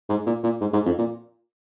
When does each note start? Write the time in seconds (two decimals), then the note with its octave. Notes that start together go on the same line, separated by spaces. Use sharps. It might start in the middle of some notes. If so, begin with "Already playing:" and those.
0.09 G#2
0.26 A#2
0.44 A#2
0.61 G#2
0.73 G#2
0.85 F2
0.98 A#2